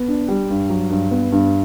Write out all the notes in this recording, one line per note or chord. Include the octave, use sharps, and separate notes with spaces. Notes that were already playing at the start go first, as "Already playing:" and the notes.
Already playing: B3
D4
G3
G2
F#3
G2
B3
G2